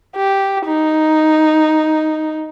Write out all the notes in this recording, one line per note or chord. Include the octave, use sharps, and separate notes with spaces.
G4
D#4